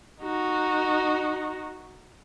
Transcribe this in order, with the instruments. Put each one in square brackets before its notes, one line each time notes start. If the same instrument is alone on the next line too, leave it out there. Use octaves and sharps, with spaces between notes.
[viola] D#4 F#4